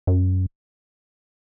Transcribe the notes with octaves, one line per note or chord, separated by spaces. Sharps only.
F#2